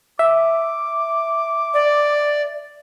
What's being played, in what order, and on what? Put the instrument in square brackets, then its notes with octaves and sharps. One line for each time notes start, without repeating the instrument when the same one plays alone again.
[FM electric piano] E5 [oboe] D6
[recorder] D5